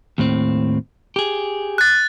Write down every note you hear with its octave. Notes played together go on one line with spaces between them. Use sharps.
D#2 A2 C4
G4 G#4
F#6 A6